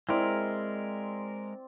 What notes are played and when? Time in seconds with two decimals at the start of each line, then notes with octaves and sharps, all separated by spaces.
0.09 G#3 C4 E4 A#4 D5